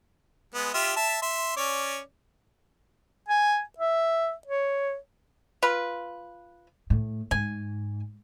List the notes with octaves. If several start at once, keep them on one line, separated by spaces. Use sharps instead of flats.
G#3 B3
F4 G4 E5
E5 A5
E5 C6
C#4 C#5 D5
G#5
E5
C#5
F4 B4
A2
G#2 G#5